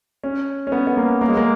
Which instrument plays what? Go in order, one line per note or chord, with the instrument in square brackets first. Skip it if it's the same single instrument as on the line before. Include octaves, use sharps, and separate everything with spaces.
[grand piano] C#4
C#4
B3
B3
A#3
A#3
G#3
A#3